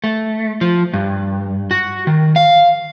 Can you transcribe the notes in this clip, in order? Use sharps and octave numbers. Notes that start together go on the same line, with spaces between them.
A3
F3
G2
F#4
D#3
F5